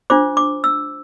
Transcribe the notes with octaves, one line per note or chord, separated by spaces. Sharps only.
D4 F4 C5 D6
D6
E6